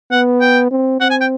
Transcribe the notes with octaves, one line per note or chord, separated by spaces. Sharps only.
B3 F#5
G5
C4
C4 F#5
G#5
G5